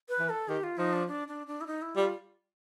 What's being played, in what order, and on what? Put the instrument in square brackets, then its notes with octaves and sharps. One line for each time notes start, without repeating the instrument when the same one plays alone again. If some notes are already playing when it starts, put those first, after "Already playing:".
[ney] B4
[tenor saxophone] E3
[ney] A4
[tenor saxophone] D#3 [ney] G4
[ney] F4
[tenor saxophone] F3 [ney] D#4
[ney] D4
D4
D4
D4
E4
D#4
E4
[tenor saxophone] G3 [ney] F4